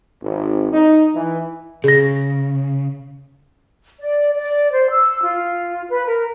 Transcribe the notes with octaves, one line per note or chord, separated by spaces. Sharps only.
G#1
D#4
E3
C#3 G#4 A#6
D5
D5
C5
E6
F4
B4
A#4